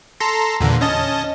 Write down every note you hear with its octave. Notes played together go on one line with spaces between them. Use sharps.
A4 A#5 C6
E2 A#2 D3
C#4 D#5 A5